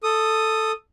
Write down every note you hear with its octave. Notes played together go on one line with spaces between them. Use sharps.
A4 D#6